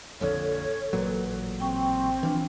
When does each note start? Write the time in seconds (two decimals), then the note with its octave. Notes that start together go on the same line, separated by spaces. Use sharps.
0.21 A#1 F2 D3 A4 C#5
0.93 A1 A#2 F#3 B4
1.60 C4 G5 C#6
2.23 E3 F3 D4